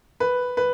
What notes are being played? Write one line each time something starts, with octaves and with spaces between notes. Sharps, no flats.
B4
B4